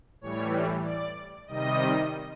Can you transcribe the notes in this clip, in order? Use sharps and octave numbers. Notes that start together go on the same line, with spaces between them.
A2 E3 G3 C#5
D5
C3 D#3 G3 D#5